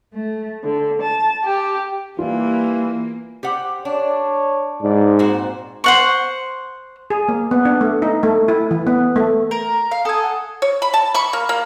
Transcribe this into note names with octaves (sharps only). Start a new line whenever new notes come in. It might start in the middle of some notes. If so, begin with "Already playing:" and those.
A3
D3
A5
G4
E3 G3 A#3 F4
G4 C5 F#5
D4 C#5
G#2 D5
A#2 C4 F#4 C5
C5 F#5 C#6
G#4
A#3
B3
D4
A3
D#4
A3
E4
E3
B3
A3
A#4 A#5
F5
A4 G#5 D#6
F#5
C#5
B5
A5
B5 C#6
A#3
A#3